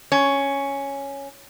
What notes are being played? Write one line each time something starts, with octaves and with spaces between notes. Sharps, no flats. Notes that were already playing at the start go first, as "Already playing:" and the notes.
C#4